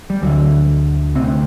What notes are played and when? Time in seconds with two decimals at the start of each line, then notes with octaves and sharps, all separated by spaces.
0.10 G3
0.22 D2 D3 F#3
1.15 D2 C3 C4